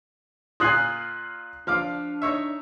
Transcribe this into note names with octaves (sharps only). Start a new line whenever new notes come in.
A#2 F4 G#5 D#6 F#6 C7
F3 D4 F5 D6
D#4 C#5 E5